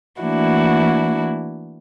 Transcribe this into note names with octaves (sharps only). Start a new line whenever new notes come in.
E3 A3 A#3 D4 E4 F#4